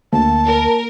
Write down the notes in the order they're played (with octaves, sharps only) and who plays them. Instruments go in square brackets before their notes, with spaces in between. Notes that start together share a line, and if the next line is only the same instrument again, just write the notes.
[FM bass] D2 [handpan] A#3 [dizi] A5
[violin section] A#4